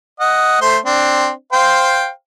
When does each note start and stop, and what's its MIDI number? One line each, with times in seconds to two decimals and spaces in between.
0.20 0.56 75
0.20 0.56 78
0.61 0.77 57
0.61 0.77 72
0.61 0.77 84
0.86 1.30 60
0.86 1.30 62
1.53 2.09 72
1.53 2.09 77
1.53 2.09 79